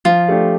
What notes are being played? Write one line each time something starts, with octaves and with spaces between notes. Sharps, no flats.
F3 F4
A3 D4 G4